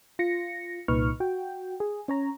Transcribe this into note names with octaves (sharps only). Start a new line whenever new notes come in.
F4 A#6 C#7
C2 A#2 D#4 B4 C#6 F6
F#4 G5
G#4
C#4 C#5 A#5